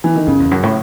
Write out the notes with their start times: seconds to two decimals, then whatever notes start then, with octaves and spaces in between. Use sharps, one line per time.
0.04 E3
0.16 D#3
0.27 F#2 C#3
0.40 E2
0.51 F#2
0.63 A2